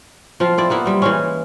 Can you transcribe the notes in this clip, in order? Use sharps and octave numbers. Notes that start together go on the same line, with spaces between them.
F3 C4 F4
C4 E4 D5
A#3 B3 E4
G3 C4
E3 G#3 C#4